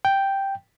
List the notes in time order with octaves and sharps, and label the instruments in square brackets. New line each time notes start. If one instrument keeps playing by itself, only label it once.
[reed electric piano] G5